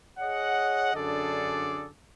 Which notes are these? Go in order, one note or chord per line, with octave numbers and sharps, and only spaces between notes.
G#4 C#5 D#5 F#5
F#2 D3 D4 G#4 A4 D5